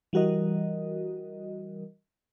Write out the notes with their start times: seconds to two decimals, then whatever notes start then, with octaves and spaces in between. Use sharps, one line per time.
0.13 E3 G3 F#4 A#4 D#5